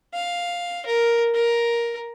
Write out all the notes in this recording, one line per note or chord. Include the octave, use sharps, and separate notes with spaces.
F5
A#4
A#4